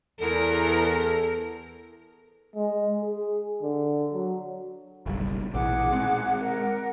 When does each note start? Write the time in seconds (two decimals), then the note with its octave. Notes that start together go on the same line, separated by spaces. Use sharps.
0.20 E2 A4 A#4
2.56 G#3
3.02 G#4
3.62 D3
4.14 F#3
5.06 F#1 B1 G3
5.54 A#1 B2 E3 G#4 F#5 D6
5.92 G#3 C4
6.40 A#4 F#5